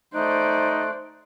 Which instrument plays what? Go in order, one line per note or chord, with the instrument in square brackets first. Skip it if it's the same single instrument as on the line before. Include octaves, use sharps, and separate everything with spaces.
[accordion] A3 F#6 [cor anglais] D#4 [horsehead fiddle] C5 D5